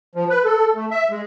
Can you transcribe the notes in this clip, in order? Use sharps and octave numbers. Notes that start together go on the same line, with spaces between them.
F3
B4
A4
A3
E5
G#3